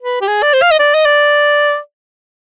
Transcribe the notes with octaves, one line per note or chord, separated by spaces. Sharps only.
B4
G4
G#4
D5
C5
F5
D#5
D5
D#5
D5